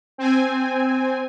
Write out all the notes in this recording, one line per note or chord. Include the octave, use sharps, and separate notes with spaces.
C4 G#5